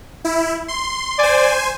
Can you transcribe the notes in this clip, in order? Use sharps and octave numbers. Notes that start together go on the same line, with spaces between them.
E4
C6
C5 D5 G#5